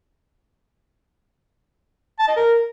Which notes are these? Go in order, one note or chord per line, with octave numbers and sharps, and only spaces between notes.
A5
D#5
A#4